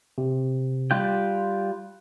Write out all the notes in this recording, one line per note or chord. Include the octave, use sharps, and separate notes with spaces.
C3
G3 F4 G5 F#6